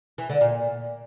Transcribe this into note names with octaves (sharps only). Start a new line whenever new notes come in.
E3
D3
A#2